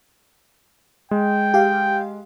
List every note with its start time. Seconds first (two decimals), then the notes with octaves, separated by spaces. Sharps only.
1.11 G#3 G5
1.54 G4 F5